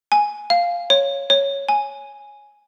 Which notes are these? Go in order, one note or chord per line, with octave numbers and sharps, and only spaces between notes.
G#5
F5
C#5
C#5
G#5